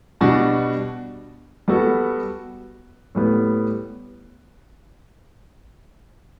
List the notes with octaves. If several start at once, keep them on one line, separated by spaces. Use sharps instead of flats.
B2 G3 D4 F#4
G3 B3 F#4 A4
A2 G3 B3